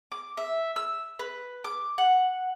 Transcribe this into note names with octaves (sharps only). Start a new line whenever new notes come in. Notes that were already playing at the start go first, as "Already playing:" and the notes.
D6
E5
E6
B4
D6
F#5